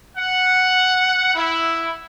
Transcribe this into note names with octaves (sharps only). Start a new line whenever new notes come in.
F#5
E4